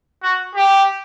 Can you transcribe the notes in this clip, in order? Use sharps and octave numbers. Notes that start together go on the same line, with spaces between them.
F#4
G4